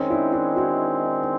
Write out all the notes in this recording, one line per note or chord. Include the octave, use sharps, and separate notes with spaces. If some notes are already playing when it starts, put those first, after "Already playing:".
Already playing: D#3 G#3 C4 C#4 D#4
D4 E4
D4 E4
E4 F#4